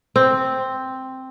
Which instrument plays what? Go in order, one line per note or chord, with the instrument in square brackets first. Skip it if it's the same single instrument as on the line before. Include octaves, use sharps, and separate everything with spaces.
[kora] C4